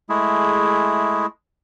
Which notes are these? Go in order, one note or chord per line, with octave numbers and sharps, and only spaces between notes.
G#3 A3 E4 G#4